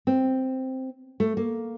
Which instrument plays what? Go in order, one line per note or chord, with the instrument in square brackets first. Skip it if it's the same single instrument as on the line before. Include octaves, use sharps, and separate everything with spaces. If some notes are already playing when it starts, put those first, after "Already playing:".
[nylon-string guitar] C4
A3
A#3